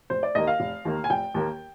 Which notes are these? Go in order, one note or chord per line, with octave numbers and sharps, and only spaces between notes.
F1 C5
D5
D#2 D#3 A#3 D#5
F5
F1
D#2 D#3 A#3
G#5
F1 G5
D#2 D#3 A#3